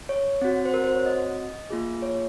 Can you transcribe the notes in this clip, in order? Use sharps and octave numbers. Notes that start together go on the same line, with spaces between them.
C#5
C4 F#4
C5
A#4
C5
C#5
D#5
A#3 F4 G#4
C#5